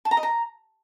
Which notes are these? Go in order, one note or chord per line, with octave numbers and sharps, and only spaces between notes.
A5
A#5
D#5
A#5